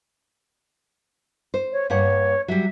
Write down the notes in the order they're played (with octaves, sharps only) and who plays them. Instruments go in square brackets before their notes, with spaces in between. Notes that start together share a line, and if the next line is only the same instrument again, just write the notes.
[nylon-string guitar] C5
[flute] C#5
[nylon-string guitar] G2 A#3 F#5 [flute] C#5
[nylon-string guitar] F#3 G3 [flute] E5